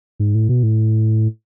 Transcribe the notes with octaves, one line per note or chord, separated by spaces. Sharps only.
G#2
A2
B2
A2